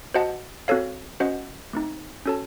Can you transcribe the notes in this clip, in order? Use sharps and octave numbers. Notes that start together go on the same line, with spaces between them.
F#4 C5 D#5 F#5 A5
C4 F#4 A4 C#5 F5
C#4 F#4 C5 D#5 F#5
A3 C4 D#4
C#4 F#4 A4 C#5 A5